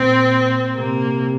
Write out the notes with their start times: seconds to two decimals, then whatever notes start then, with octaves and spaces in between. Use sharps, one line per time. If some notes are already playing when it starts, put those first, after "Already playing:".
Already playing: A#2 C4
0.76 C3 A#3